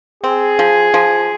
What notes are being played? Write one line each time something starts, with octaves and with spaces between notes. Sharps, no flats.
C4 G#4
F3
F3